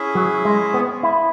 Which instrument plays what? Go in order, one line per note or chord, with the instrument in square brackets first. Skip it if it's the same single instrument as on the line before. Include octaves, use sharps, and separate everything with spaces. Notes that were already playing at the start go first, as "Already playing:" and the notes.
Already playing: [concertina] C#4 E4 G#4 E5
[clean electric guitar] F#3
G#3
B3
E4